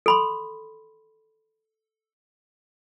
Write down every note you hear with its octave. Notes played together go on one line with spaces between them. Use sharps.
A4 B5 C6